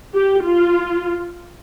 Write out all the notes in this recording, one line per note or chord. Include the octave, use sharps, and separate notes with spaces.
G4
F4